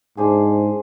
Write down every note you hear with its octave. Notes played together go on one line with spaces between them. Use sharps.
G#2 D4 G#4 C5